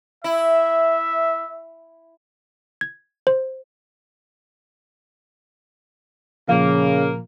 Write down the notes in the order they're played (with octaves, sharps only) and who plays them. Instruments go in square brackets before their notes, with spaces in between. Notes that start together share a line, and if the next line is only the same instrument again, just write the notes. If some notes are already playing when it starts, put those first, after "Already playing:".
[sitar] E4 [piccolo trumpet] E5
[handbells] G#6
C5
[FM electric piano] A#2 F3 [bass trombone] C#3 [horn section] A#3 [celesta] F5